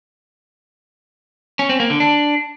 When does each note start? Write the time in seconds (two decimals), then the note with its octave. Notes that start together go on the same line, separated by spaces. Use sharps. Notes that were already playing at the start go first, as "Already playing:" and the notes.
1.59 C#4
1.69 C4
1.80 A#3
1.90 D3
2.00 D4